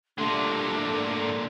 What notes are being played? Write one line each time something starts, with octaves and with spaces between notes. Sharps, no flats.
A#2 D3 G3 A3 D4 A#5 C6
G#2 D5